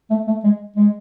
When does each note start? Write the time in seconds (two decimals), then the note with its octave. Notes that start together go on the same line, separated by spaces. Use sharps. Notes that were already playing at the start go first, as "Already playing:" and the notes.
0.10 A3
0.27 A3
0.44 G#3
0.76 G#3